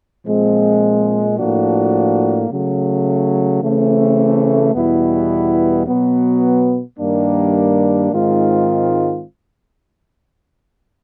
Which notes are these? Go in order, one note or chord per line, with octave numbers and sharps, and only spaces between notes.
A#2 F3 G#3 C4
A2 F3 A#3 D4 F#4
C#3 F#3 A3
C#3 E3 A3 C4
E2 B2 G3 B3 E4
B2 F#3 B3
G2 D#3 G3 A#3 D4
G#2 D#3 G#3 C4 F4